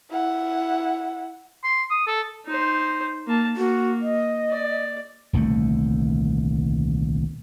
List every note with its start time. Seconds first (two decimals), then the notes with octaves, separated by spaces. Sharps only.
0.10 E4 F#5
1.64 C6
1.90 D#6
2.07 A4
2.46 D#4 C5
3.27 A#3 A5
3.57 A#3 F#4
4.02 D#5
4.50 D5
5.33 D#1 C2 D3 A3